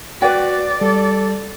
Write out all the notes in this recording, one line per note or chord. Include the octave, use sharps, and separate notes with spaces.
F#4 B4 D5 G5
G3 A4